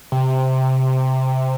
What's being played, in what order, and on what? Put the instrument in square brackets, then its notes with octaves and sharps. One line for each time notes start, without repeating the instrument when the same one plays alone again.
[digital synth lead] C3